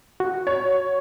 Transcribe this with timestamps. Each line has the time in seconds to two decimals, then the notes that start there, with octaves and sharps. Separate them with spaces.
0.20 F#4
0.47 C#5